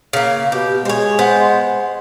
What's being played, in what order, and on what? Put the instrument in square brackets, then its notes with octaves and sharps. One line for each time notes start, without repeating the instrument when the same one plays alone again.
[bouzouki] C#3 A#3
[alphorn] B2 [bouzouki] G4
[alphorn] G#3 [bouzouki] C5 C#5
[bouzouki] B3 C5